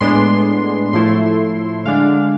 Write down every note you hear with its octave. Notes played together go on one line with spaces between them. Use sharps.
A2 G#3 B3 D4 C6
A2 F3 A3 E4 C6
D3 G#3 D4 F5